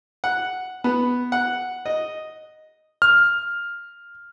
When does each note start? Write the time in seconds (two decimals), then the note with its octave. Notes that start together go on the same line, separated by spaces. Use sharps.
0.24 F#5
0.84 B3
1.32 F#5
1.85 D#5
3.02 F6